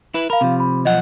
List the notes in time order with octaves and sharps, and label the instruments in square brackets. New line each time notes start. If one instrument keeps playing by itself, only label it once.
[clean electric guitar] E4 B4
[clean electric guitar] A#4 [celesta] F5 B5
[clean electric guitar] C3 F3
[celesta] B5
[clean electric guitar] B1 F3 F#5 [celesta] D#5